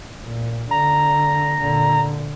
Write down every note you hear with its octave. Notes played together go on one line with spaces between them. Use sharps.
A#2
D3 A#5
A#2 D3